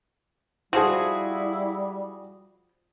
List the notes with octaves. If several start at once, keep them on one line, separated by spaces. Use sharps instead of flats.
F3 G3 E4 F#4 G#4